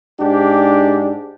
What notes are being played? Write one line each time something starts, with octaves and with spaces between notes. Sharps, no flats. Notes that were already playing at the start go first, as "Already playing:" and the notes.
G#2 D4 G4